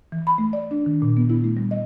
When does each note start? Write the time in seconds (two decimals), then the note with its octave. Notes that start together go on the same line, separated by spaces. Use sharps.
0.12 E3
0.27 B5
0.38 A3
0.53 D5
0.71 D4
0.86 D#3
1.02 A#2
1.17 B3
1.30 E4
1.44 A3
1.57 G3
1.71 D#5